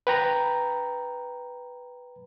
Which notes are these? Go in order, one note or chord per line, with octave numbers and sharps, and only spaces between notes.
B4 G5 A#5 B5